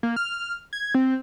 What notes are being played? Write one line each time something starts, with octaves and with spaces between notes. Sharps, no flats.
A#3
F6
G#6
C4